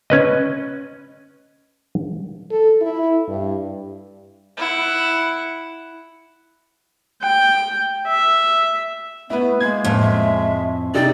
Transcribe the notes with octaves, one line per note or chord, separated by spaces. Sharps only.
C#4 B4 D#5
A4
E4
G2
E4 F#5
G5
E5
A3 B3 E4 B4
G#3 A#3 G#6
F2 A2
E5
C3 D#4 D5 G5